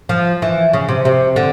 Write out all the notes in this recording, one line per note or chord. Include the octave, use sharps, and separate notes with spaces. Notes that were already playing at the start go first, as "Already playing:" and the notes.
F3
E3
C#3
C3
C3
D3